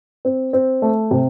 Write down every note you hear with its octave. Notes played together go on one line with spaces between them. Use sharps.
C4
C4
A3
C3